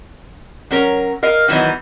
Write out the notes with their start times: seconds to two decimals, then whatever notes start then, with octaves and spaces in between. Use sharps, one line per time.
0.71 F#3 C#4 A#4
1.23 A#4 D#5 F5
1.48 D#3 E3 F#3 B3 D#4